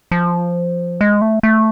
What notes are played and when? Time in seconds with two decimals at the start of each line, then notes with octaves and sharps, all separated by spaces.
0.12 F3
1.01 G#3
1.22 A3
1.43 A3